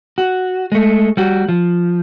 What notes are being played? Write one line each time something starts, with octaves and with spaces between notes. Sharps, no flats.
F#4
G#3 A3
G3 F#4
F3